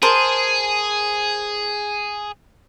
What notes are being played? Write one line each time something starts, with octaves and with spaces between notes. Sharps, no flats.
G#4 A#4 C5 A5